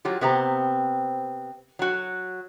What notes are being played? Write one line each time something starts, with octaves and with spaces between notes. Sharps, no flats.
F#3 F4 G4
C3 B3 C4 G4 A#5
F#3 F#4